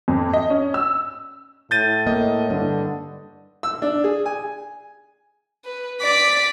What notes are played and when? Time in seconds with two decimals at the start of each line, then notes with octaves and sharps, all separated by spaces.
0.08 F2
0.33 D#5
0.50 C#4
0.74 E6
1.71 A2 G6 A6 D#7
2.07 A#3 D#5
2.50 G2 D3
3.63 E6
3.82 D4
4.04 G#4
4.26 G#5
5.65 B4
6.01 D5 D6 B6